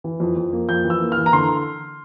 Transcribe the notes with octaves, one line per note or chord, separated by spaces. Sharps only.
E3
F2
F2
A#3
F2 G6
E3
E6
A#3
F6
E3
A#5
D3 C6